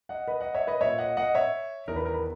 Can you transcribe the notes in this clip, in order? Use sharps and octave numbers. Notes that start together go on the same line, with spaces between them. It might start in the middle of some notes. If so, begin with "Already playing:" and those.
D#5 F#5
B4 D#5
D#5 F#5
C#5 E5
B4 D#5
A#2 C#5 E5
D#5 F#5
D#5 F#5
C#5 E5
E2 D#3 A#4 B4
A#4
B4